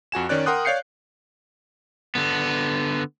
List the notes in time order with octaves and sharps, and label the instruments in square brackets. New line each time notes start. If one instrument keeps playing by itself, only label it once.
[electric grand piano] F2 F#4 G#5 E7
D#3 C#4 C#5 D5 F#6
A#4 F#5 G5 C6 D#6 F#6
C#5 D5 F5 G6 C7 C#7
[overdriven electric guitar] D3 B3